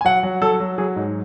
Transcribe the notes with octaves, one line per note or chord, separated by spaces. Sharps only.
G#5
F#3 F#5
F#3
F#3 A4
F#3
F#3 G#4
G#2